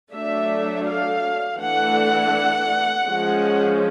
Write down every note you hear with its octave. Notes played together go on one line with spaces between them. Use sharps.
F#3 A3 D4 E5
F5
E3 A3 D4 F#5
F3 G#3 C#4